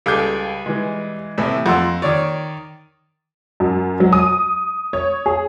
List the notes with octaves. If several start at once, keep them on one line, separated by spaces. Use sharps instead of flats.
C#2 G3 G#4 A4 D6 G6
E3 G#3
A2 C3 E3
F2 F#5 C6 E6
D#3 C#5 D5
F#2
F#3
D#6
C#5
G#4